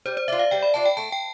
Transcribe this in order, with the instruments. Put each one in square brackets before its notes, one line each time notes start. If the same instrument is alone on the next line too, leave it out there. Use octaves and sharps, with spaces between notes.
[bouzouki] G3 [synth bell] C5
[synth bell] C5
[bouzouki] D4 F4 [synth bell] E5
[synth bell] F5
[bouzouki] G3 [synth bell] G5
[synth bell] B5
[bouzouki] D4 F4 [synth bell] A5
[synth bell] G5
[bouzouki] A3 [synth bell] A5
[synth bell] G5